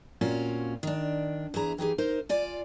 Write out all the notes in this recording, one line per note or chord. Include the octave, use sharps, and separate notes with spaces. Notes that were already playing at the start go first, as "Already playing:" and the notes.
A#2 C4 C#4 F4 F#4
D#3 D4
E2 E4 G#4 A#5
E3 D#4 G4 G#4
D#4 A#4 C5
F4 D5 G#5